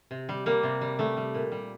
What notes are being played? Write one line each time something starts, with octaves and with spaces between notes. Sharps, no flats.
C3
G3
G3 A#3
C3
G3
G3 A3
G3
A#2
G3